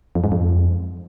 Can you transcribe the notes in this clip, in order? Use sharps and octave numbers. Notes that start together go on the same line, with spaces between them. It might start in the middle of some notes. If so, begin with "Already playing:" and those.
F2
G#2
F2